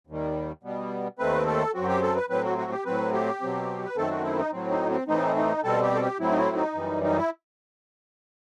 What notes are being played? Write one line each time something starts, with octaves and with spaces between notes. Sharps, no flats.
D#2 D#3 G3
B2 G3 B3
D#2 D#3 A3 C4 B4
A4
F#2 F#3 C4 F#4
G4
A4
B4
A2 F#3 C4 B4
F#4
F#4
G4
A2 F#3 C4 B4
G4
B2 F#3 C4
B4
F#2 D#3 A3 C4 A4
F#4
E4
D#4
A2 F#3 C4
D#4
C4
A2 E3 A3 C4 D#4
D#4
B2 G3 C4 A4
G4
A4
G4
A2 F#3 C4 E4
D#4
E4
D#4
F#2 E3 G3
D#4
E4